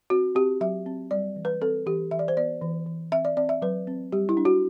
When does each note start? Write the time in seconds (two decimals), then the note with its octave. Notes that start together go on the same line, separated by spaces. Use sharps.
0.10 C4 F#4
0.35 C4 G4
0.61 F#3 E5
0.86 C4
1.11 G3 D5
1.36 E3
1.45 B4
1.61 C4 A4
1.86 E3 G4
2.11 E3 E5
2.19 D5
2.28 C5
2.37 B3 D5
2.62 E3
2.86 E3
3.12 C4 E5
3.25 D5
3.37 C4 D5
3.49 E5
3.62 F#3 B4
3.87 C4
4.12 G3 G4
4.29 E4
4.37 D4
4.45 F#4